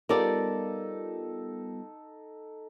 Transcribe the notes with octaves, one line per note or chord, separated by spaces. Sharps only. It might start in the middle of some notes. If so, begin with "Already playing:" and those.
G3 B3 D#4 F4 A4 A#4 D5 G5